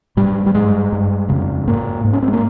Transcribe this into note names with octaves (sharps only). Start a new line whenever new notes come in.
G#2 G3
G3
G2 G#3
G2
F2 C#3
G#2 A#3
G#2
C#4
C4
G#3
A#3